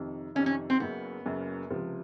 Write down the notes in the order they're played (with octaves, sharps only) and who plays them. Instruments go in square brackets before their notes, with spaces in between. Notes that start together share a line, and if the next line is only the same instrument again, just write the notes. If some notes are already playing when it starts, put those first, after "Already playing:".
Already playing: [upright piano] F2 C3 D#3
[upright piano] F2 C3 D#3 [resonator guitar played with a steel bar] C#4
[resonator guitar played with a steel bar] C#4
C4
[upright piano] F#1 F#2 C#3 [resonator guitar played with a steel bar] B3
[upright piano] F#1 F#2 C#3
C#2 C3 F3